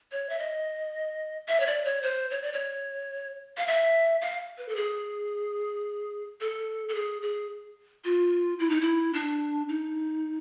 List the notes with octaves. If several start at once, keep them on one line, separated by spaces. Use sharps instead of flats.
C#5
E5
D#5
E5
C#5
D5
C#5
C5
C#5
D5
C#5
F5
E5
F5
B4
A4
G#4
A4
A4
G#4
G#4
F4
E4
D#4
E4
D4
D#4